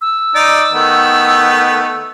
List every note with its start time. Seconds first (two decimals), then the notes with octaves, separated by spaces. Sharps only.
0.01 E6
0.35 D#4 D5
0.73 D#3 A3 B3